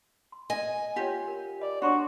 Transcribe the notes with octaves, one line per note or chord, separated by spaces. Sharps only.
C6
D#5 G#5
F4 G4 C#5 F#5
A#4
D5 D#5
D4 F#4 C#5 C6 C#6